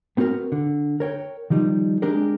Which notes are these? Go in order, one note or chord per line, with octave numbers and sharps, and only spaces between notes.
B3 C4 F#4 G4 A#4
D3
A#4 C#5 G5
D#3 F3 G3 D#4
G#3 C4 D4 G4 G#4 A#4